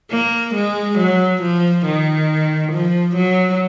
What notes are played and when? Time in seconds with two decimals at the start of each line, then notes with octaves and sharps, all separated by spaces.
0.12 A#3
0.54 G#3
0.98 F#3
1.42 F3
1.86 D#3
2.72 F3
3.16 F#3